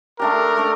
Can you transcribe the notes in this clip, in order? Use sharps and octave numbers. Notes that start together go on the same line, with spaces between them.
A3 D4 G4 A#4
A3 D4